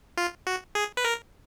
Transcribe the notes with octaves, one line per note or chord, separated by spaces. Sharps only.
F4
F#4
G#4
B4
A#4